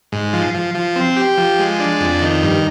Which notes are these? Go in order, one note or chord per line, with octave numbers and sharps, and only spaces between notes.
G#2
F3
F3
F3
C4
G4
F3
G#3
D4
F2
D#3
G2